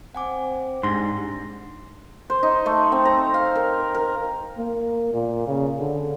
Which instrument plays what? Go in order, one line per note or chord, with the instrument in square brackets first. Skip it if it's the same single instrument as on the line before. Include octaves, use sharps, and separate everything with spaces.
[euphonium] C4 [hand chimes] F#5 G#5 D6
[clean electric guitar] G#2 [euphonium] G3 [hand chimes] D4 A#6 [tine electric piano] C6
[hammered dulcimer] C5
D#4
A3
C4
A#5
F5
A#4
A#4
[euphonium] A#3
A#2
C#3
D3